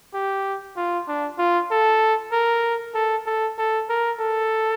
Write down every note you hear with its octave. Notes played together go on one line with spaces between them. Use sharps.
G4
F4
D4
F4
A4
A#4
A4
A4
A4
A#4
A4